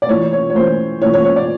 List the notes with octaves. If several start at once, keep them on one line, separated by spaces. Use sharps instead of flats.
D5
A2 E3 C#5
C#5
C#5
A2 E3 C5
A2 E3 C#5
C#5
C#5
D5